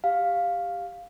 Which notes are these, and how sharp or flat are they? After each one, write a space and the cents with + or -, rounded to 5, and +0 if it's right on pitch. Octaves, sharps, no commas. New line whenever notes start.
G4 +10 F5 +5